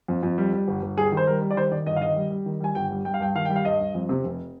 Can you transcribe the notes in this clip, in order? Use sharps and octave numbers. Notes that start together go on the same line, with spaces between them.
F2
F2
G3
G3
G1
G1
G3 G#4
D#3
C5
G3 A#4
G3
D5
D#3 C5
D#3 D5
G1 D#5
F5
D#3 D#5
G3
G3
D#3
G3 G#5
G1 G5
G3
G3 G5
F5
G2 G5
D#3 F5
G5
G3
F5
G2 D#5
G2
F2
C3
F1